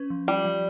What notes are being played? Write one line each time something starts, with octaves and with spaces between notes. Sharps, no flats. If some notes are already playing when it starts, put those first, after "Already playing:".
Already playing: C#4 B4
F3
G3 F4
F3